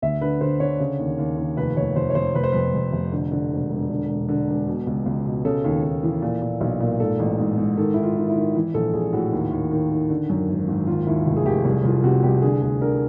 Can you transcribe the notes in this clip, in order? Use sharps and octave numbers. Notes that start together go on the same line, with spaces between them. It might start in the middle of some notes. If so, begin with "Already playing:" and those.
D2 E5
D3 B4
D3 C5
D3 C#5
C#3
D#2
D#2
D#2
F1 B4
F1 C#5
F1 C5
C#5
F1 C5
F1 B4
C5
F2 B4
F2
F1
D3
D3
E1
E1
D3
E1
D3
E1
B2
C#2
C#2
B2
C#3 A4
D#2
D#2
E3
A#2
A#2
B1
A#2
G#2 A4
A1
G#2
G#2
D#3 A4
D#3 E4
F4
D#3
E4
D#3
E3
A#1 A4
A#1 G#4
A2 F#4
D#2
D#2
D#3
D#3
D3
F#2
G#1
G#1
D#2 F4
D#2 E4
F1
G#4
F1 G4
C2 G#4
C2 F4
C3 F#4
C2 G4
D3 G#4
D2 G#4
D3 A#4